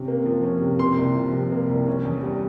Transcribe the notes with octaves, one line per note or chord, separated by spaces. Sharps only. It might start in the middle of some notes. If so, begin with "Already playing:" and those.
Already playing: C3 C#4
A#3
F3
C#4
C3
A#3 C6
C2
F3
C3
A#3
C2
C#4
E2
G3